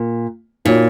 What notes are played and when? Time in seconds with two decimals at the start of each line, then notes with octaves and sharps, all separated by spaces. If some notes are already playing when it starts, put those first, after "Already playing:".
Already playing: A#2
0.65 A#2 D#4 F#4 C#5